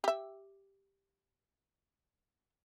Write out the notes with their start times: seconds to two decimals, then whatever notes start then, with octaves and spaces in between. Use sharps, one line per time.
0.04 G4 E5